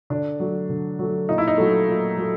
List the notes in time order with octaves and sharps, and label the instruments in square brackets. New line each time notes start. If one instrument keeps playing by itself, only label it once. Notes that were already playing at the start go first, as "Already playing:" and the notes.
[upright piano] D3 D4
F#3 A3
D3
F#3 A3
A#2 D#4
E4
D#4
F#3 A3
A#2
F#3 A3